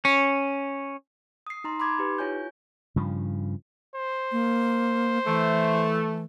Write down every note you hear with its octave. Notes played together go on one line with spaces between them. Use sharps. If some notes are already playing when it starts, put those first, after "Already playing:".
C#4
D#6 C7
D#4 A#5 C6
B5 C6 D6 G#6
D#4 G4 B4
E4 F4 C#5 G#5 G6
G2 C#3 F3
C5
A#3
E3 A3